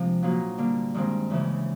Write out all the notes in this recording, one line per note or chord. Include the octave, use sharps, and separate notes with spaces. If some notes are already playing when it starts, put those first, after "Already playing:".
Already playing: C3 F3 G#3 C4 D4
A#2 F#3 A#3 D#4 F#4
D3 G3 A#3
G2 D#3 G#3 C4
D2 C#3 E3